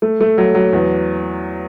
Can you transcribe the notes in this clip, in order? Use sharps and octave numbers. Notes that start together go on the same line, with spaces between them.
A3
A3
F#3
F#3
E2